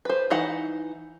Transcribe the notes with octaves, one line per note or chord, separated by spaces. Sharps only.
B4 C5
E3 D#4 F#5